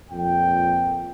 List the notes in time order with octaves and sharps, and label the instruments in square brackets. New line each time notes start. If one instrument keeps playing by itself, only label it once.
[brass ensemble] F2 A#2 G5